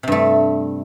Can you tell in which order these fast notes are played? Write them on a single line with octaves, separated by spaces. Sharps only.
C3 G2 A3